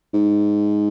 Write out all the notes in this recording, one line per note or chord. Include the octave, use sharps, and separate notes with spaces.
G#2